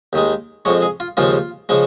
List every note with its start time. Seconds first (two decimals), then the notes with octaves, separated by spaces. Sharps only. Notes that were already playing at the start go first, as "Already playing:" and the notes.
0.13 D#2 D#3 G#3
0.65 F2 F3 G#3 C#5
0.82 G#4
1.00 F4
1.17 D#2 C#3 F3 G#3 F4
1.69 C#3 F3 G#3